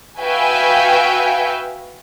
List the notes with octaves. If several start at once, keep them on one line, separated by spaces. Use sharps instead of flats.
F#4 B4 E5 F5 G5 G#5